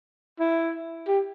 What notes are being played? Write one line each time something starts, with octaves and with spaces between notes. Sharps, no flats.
E4
G4